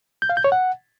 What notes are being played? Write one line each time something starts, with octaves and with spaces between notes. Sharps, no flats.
G6
F5
G6
C#5
F#5